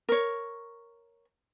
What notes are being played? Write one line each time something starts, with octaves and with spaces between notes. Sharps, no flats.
A#4 C#5